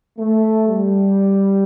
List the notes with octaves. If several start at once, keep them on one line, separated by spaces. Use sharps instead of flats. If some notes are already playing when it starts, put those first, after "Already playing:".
A3
G3